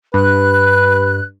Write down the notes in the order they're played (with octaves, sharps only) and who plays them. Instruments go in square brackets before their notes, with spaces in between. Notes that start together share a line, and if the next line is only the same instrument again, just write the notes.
[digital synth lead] G2 [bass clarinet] B4 [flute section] F#6